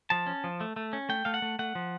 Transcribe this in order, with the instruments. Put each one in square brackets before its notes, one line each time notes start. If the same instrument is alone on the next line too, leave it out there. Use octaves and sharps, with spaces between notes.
[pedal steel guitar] F3 A5
C#4
F3
A3
A3
C#4
A3 G5
A3 F5
F#5
A3
A3 F#5
F3